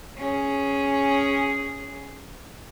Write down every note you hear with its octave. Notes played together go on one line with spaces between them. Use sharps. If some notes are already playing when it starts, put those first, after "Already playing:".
C#4 G#4